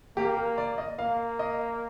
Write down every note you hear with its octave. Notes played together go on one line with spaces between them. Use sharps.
A#3 G4
A#4
D5
D#5
A#3 F5
D#5